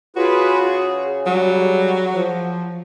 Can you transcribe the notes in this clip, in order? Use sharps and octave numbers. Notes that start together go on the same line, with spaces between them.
C#3 F4 F#4 G#4 B4
G#4
F#3 G3
F3